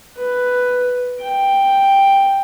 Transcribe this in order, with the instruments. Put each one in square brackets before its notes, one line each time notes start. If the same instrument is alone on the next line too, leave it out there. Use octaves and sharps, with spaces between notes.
[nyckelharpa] B4
G5